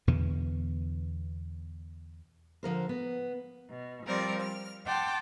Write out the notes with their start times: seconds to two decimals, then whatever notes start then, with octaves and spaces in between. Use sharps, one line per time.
0.07 E2 B2 D3 E3
2.63 D3 F3 A#4 C5
2.89 B3
3.70 B2
4.05 F3 G3 C4 A#4 D5
4.40 F6
4.86 F#5 G5 A5 C6 D6 F6